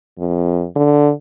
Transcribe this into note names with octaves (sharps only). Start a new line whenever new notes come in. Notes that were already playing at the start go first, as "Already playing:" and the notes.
F2
D3